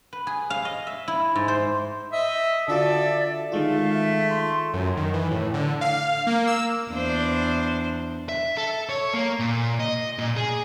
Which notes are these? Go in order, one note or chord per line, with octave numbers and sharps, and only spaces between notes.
B4
G#4
F5
D#5
E5
E4
G#2
C5
D#5 E5
D3 F4 F#4 A4 D5 E5
D#3 G#3 A3 F4 F5
E5
C6
F#2
D#3
E3
A2
D3
F5
A#3
E6
E2 D4 C5
E5
A4
C#5
A#3
A#2
D#5
A#2
G#4